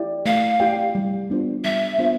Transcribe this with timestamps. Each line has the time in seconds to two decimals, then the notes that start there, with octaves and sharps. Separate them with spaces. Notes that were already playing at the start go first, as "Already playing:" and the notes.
Already playing: E4 G4 D5 G5
0.26 A3 F5
0.60 E4 G4 D5 G5
0.95 G3
1.30 B3 D4 F4 C5
1.64 G3 E5
1.98 B3 D4 F4 C5